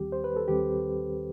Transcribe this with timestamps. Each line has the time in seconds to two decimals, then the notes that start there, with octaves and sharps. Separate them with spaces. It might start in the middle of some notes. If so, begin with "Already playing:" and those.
Already playing: D#2 D#3 G3 C4 G4
0.12 C5
0.24 B4
0.36 A4
0.48 D#2 D#3 G3 C4 G4